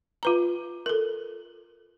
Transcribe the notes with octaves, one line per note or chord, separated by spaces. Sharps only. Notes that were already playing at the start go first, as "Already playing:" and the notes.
F4 B4 A#5
A4 A#4